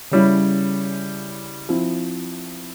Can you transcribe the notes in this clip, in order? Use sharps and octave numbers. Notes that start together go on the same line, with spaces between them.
C#3 G3 C#4 E4
F3 C4 E4